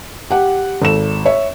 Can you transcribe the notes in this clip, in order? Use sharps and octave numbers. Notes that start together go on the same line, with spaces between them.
G4 F#5
G#1 A4 E7
C#5 E5